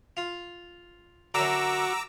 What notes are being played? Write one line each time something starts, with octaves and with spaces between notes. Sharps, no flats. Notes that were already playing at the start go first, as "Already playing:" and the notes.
F4
F#2 D3 F#4 A#5 D6 E6